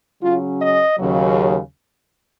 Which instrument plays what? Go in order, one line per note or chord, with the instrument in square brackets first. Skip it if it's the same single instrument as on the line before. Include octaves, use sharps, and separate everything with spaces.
[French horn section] C#3 F#3 C#4 F4
D#5
D#2 C#3 F#3